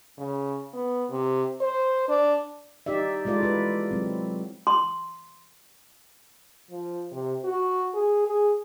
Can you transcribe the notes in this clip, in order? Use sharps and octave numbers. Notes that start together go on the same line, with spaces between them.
C#3
B3
C3
C5
D4
D#4 G4 D5 E5
G#3 E4 F4 A4 D5
E4 B4
F#3 C4
C6
F3
C3
F#4
G#4
G#4